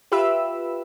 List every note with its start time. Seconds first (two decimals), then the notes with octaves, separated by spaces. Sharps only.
0.12 F4 G4 B4 E5 B5 E6